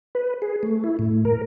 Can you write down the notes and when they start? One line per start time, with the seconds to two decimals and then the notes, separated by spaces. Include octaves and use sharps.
0.15 B4
0.42 G#4
0.63 A3
0.84 E4
0.99 A2
1.25 A#4